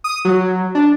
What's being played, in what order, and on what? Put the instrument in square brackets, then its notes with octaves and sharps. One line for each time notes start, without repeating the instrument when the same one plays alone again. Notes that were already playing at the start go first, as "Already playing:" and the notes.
[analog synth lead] D#6
F#3
D4